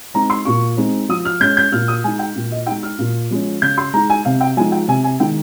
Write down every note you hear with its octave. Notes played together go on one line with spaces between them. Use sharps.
G#3 C4 D#4 A#5
C6
A#2 C#6
G#3 C4 D#4
F3 D#6
F6
G#3 C#4 G6
G6
A#2 F6
D#6
G#3 D#4 G#5
G5
A#2
D#5
G#3 D#4 G5
F6
A#2
F3 G#3 C#4
C#3 G6
C6
G#3 D#4 A#5
G#5
C3 F5
G5
F3 G#3 D#4 G#5
G5
C3 G#5
G#5
D#3 G#3 D#4 G5